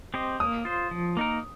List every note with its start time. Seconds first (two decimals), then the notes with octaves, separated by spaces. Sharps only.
0.14 C4 G4 C5 D#5
0.40 A#3 D#6
0.65 F4 C5
0.91 F3
1.17 A#3 D#4 A#4